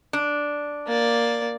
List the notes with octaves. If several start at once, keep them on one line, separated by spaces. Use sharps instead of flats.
D4
A#3 D5